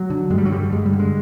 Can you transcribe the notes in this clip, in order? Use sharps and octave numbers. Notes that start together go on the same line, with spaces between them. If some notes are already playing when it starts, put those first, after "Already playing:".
Already playing: F#3
D3
G2 G#3
G3
F#3
D3 G3
G2 G#3
G3
D3
G#3